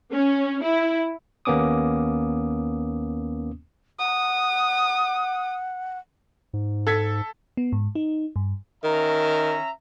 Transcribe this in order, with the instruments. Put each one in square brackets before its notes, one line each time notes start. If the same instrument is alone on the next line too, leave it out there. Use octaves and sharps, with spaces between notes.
[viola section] C#4
E4
[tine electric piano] D#2 A#3 B3 C#4 D6 D#6
[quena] F#5 [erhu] D#6
[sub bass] G#2
[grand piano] A4 G#6 B6
[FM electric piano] B3
G#2
D#4
G2
[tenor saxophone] D#3 [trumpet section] C#4 E5 A#5